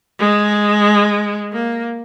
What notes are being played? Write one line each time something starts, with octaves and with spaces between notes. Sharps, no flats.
G#3
A#3